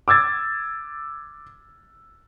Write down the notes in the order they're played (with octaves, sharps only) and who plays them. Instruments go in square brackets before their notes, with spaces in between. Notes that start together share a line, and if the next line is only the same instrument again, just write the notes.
[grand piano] D6 E6 G#6 A6